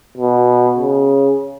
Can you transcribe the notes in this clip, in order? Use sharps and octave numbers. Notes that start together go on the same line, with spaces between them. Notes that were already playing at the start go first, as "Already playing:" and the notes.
B2
C#3